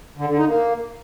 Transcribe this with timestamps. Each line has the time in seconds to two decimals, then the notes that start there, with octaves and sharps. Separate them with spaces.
0.17 D3
0.27 D3
0.37 D#4
0.48 A#3